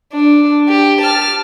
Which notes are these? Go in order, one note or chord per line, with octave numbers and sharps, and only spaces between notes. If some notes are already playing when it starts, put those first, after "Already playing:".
D4
G4
A5 F6